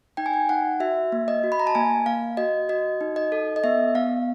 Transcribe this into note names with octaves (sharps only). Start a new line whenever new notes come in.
D#4 G5
G#5
G5
D#4 F#5
F#4 E5
A#3
D#5
F#4
B5
A#5
A5
A#3 G#5
A#3 F5
F#4 D#5
F#4 D#5
D#4
D#5
A4
D#5
B3 E5
B3 F5